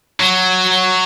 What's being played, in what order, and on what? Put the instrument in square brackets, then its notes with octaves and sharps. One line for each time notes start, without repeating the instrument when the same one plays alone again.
[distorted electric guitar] F#3